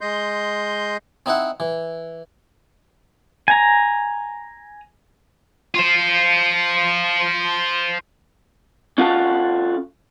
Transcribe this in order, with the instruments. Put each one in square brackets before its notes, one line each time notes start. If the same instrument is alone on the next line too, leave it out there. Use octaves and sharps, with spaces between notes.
[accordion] G#3 D#5 C6 G6
[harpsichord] C4 D#4 E4 F#5
E3
[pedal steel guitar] G#5 A#5
[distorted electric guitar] F4 C5
[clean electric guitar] C#4 F4 F#4 A4 F5 A5